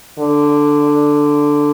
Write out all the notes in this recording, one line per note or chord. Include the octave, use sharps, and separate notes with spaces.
D3